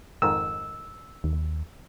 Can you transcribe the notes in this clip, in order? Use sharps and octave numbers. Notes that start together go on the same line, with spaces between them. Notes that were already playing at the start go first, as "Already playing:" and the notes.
F2 G#2 D#3 E6
D#2